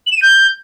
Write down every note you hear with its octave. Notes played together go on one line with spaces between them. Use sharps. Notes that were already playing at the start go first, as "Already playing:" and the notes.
F#7
E7
D#7
G6